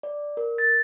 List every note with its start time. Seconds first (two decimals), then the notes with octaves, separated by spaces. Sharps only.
0.03 D5
0.37 A#4
0.58 A6